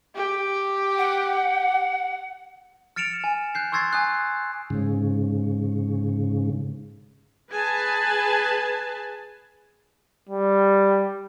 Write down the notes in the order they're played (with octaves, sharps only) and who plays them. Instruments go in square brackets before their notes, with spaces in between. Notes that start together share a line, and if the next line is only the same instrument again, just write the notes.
[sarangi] G4
[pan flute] F#5
[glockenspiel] F6 A6 C#7 D7 E7 F7
G#5
F#6 G6 C7
C6 C#6 E6 G#6 A6 C7
G#5 D#6 F#6
[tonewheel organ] G#2 C#3
[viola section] G#4 B4 G#5 A5
[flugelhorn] G3